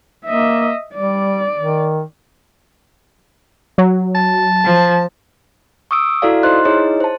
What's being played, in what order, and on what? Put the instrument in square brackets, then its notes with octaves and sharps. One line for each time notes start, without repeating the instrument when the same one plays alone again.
[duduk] A#3 [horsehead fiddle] D#5 E5
[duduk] G3 [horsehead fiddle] D5
[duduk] D#3
[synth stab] F#3
[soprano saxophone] A5
[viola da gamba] F3
[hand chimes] C#6 D#6 E6 D7
E4 F#4 A4 D5 F5
D#4 C5 D#5 C6 F#6
D#4 E4 G#4 C#5 D#5
C5 A5